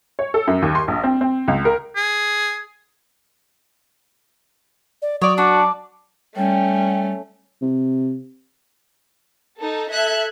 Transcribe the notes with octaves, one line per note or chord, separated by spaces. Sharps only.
C#5
A4
F#2
D#2
C6
A#1
C4
C4
C#2
A#4
G#4
D5
F#3 C#5 D5 D#6
D4 F#4 D6
G3 A3 C#4 G5
C3
D#4 A4
A4 E5 F#6 G#6